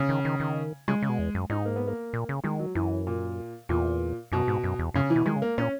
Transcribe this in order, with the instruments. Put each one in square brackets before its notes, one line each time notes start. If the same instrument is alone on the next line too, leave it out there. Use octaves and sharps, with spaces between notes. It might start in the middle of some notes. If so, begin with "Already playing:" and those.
Already playing: [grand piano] C#3
[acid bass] D#3
D#3
D#3
[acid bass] C#3 [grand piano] G#3
[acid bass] C#3
B2
E2
F#2
[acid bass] G#2 [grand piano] D#4
[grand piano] A#3
B3
A#3
[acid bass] A#2
C#3
[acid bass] D#3 [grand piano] G#3
[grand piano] F#3
[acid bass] F#2 [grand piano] E3
[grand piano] A#2
[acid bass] E2 [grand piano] A#2
[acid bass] F#2 [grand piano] B2
[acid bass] G#2
F#2
E2
[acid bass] F#2 [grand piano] C#3
[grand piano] E3
[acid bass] B2
[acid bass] D#3 [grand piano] G#3
[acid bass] C#3
[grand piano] A#3
[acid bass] A#2 [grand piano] C#4